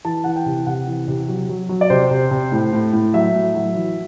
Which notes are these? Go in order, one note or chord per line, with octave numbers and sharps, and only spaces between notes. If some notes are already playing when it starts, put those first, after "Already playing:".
E3 A5
E3 F#5
G5
C3
C3 F#5
E3
C3
F#3
F#3
F#3
D5
C3 C5
C3
C3
A2
A2
A2
F#3 E5
A2
F#3
E3